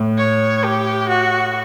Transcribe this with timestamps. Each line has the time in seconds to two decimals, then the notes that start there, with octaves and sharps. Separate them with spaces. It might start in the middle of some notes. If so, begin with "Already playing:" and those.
Already playing: A2
0.18 C#5
0.64 G4
1.09 F#4